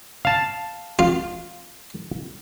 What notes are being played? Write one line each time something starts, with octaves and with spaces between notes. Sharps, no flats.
F5 A5
F4